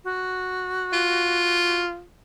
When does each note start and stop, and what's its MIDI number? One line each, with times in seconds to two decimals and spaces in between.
0.05 1.82 66
0.93 2.04 65